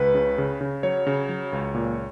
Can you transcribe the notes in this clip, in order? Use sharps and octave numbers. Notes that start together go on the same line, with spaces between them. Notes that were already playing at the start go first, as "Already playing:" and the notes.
Already playing: C#2 B4
C#3
C#3
C#3
F#3 C#5
C#3
F#3
C#2
A#2